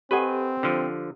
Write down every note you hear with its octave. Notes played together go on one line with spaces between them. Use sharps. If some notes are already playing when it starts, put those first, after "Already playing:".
C4 G4 A4 B4 D#5 F#5 G#5
D3 F3